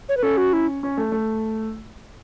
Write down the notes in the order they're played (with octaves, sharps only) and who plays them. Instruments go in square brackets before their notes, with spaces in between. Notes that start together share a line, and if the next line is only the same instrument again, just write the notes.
[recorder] C#5
B4
[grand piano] C#4 [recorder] A4
[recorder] F#4
E4
[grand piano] C#4
A3
A3